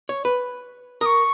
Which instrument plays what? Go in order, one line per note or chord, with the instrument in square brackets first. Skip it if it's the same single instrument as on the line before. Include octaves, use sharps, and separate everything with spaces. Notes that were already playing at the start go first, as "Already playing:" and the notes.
[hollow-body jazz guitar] C#5
B4
[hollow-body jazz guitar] A#4 [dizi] D#6
[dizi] C#6